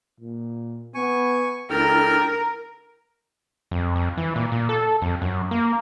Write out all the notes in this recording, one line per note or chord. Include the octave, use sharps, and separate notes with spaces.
A#2
B3 G#5 C#6
C#2 D4 E4 A4 A#4 G5 F6
F2
F2
E3
A#2
A#2
A4
F2
F#2
A#3